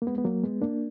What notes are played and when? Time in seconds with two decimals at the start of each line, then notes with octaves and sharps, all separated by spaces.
0.02 A#3
0.07 G#3 B3
0.18 B3
0.24 F#3 A#3
0.43 G#3 B3
0.62 A#3 D4